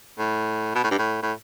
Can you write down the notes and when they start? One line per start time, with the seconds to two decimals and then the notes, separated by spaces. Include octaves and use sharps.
0.18 A2
0.75 B2
0.84 A2
0.91 G2
0.98 A2
1.23 A2